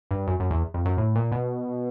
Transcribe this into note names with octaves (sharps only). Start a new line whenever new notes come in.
G2
F#2
F#2
E2
F2
F#2
A2
A#2
B2